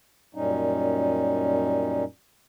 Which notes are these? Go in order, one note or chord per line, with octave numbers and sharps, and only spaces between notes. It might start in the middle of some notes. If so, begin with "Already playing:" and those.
F#2 A#2 G3 C#4 D#4